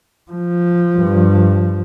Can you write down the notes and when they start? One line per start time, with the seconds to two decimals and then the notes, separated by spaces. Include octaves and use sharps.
0.32 F3
0.97 G2